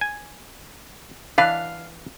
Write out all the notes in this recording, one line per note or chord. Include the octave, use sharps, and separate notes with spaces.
G#5
E3 D4 B4 F5